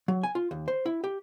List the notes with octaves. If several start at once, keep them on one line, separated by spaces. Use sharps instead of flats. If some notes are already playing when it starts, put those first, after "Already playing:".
F#3
G#5
F4
D#2
C5
E4
G4